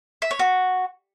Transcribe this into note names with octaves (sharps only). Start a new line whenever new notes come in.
E5
C#5
F#4